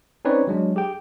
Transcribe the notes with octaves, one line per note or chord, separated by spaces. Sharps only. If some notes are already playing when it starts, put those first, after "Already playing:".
C4 C#4 D#4 B4 C#5 D5
F#3 G#3 D4
G4 G#4 G5